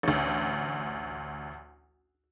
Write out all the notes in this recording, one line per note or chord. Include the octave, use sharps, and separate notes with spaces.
A1 D2